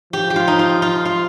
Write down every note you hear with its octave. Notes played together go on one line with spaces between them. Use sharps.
F3 G4
G4
F4
D#4
F4
F4
F4